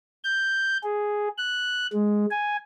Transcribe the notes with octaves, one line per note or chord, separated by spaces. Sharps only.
G6
G#4
F#6
G#3
G#5